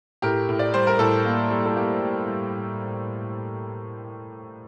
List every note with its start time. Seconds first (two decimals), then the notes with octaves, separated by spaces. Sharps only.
0.22 A2 G4 A#4
0.49 A2
0.59 D5
0.74 G3 C5
0.87 A#4
0.99 A2 A4
1.25 A#3
1.51 G3
1.66 A4
1.77 A#3 G4
2.02 G3
2.28 G3